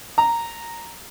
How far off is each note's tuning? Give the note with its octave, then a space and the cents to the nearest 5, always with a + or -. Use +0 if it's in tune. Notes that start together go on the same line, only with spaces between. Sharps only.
A#5 -5